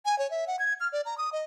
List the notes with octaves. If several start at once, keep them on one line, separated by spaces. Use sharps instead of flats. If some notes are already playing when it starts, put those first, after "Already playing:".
G#5
C#5
E5
F#5
G#6
F6
D5
A#5
D#6
D#5